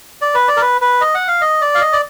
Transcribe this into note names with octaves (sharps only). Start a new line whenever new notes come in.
D5
B4
D5
A#4
B4
B4
D#5
F#5
F5
D#5
D5
F5
D#5
D5